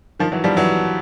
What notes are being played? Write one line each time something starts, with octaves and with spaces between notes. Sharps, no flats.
D#3 F3
E3 F#3
F3 G3
E3 F#3